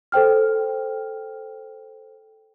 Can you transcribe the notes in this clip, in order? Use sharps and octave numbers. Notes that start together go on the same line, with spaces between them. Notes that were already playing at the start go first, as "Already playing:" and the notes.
A4 C5 G5 F6